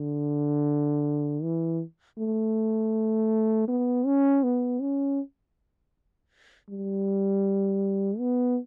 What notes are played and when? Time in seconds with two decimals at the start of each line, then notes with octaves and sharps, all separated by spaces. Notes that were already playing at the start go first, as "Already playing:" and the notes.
Already playing: D3
1.43 E3
2.18 A3
3.68 B3
4.06 C#4
4.44 B3
4.81 C#4
6.69 G3
8.19 B3